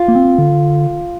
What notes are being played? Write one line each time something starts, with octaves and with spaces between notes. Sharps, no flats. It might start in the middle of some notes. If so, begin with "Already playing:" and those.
Already playing: F4
A#3
C4
D3